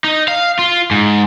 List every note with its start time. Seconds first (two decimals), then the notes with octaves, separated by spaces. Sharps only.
0.04 D#4
0.28 F5
0.59 F4
0.91 G#2